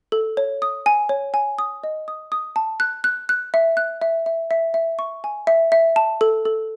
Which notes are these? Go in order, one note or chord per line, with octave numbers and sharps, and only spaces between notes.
A4
C#5
D#6
G#5
C#5
G#5
D#6
D#5
D#6
D#6
A5
F#6
F#6
F#6
E5
F#6
E5
E5
E5
E5
C#6
G#5
E5
E5
A5
A4
A4